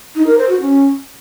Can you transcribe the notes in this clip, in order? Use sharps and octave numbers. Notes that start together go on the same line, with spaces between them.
D#4
A#4
C5
F#4
C#4